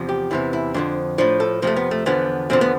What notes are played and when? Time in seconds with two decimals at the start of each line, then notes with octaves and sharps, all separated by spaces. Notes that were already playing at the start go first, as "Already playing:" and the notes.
Already playing: E2 C3 F3
0.09 G4
0.31 E2 C3 E3 E4
0.53 E4
0.74 F2 D3 F3 D4
1.18 A2 F3 D4
1.40 A4
1.62 F2 C3 F3 A3
1.76 B3
1.91 A3
2.06 E2 D3 F3 B3
2.50 E2 D3 F3 C4
2.61 B3